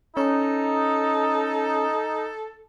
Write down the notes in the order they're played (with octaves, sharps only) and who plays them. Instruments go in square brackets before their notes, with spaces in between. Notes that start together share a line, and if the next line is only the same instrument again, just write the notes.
[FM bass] C#4 [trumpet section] D#4 [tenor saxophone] A4